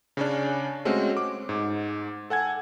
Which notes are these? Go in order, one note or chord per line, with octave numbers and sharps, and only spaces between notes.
C#3 C#4 D4
G#3 A3 C4 C#4 F#4
D6
G#2
A4 F#5 G#5 G#6